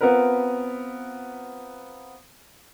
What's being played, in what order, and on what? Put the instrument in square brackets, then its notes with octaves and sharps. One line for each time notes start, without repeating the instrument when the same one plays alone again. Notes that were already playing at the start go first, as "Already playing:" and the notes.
[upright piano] B3 C4 F4 A#4 B4